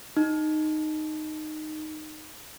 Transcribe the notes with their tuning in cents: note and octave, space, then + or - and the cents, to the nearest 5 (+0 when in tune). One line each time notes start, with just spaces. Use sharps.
D#4 -10